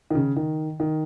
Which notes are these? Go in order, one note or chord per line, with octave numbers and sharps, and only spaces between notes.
D#3
C#3
D#3
D#3